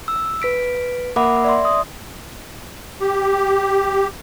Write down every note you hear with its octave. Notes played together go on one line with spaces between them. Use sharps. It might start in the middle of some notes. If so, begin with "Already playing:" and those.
E6
B4 B6 D7
A#3 A#4 E5 F#5 B5 D6
D5 E5 C6
D#6
G4